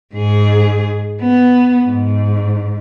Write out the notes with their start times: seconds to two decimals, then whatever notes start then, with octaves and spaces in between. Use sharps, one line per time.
0.14 G#2 G#4
1.22 B3
1.86 G#2